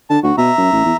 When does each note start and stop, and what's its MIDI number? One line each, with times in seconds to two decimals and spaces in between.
0.10 0.18 50
0.10 0.20 81
0.23 0.32 38
0.23 0.36 66
0.38 0.51 47
0.38 0.97 76
0.38 0.97 82
0.58 0.70 42
0.72 0.85 33
0.85 0.93 40